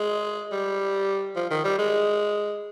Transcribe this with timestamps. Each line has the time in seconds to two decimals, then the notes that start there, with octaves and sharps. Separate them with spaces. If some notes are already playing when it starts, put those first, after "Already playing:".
Already playing: G#3
0.52 G3
1.36 F3
1.51 D#3
1.64 G3
1.79 G#3